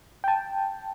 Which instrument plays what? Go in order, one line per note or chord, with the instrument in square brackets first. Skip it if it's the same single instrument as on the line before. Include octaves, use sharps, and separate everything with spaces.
[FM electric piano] G5 A5